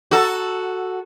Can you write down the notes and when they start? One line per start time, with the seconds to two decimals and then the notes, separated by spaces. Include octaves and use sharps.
0.11 F#4 A4